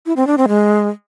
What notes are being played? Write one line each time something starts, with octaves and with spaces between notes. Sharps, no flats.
E4
C4
D4
C4
G#3